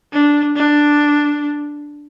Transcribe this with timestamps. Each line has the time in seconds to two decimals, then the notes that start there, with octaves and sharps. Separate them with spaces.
0.13 D4
0.56 D4